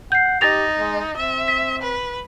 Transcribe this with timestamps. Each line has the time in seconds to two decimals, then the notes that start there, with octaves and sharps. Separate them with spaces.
0.12 F#5 G6 C7
0.41 D#4 G4 A6 A#6 F7
0.79 G#3
1.17 C4 E5
1.48 B6
1.82 B4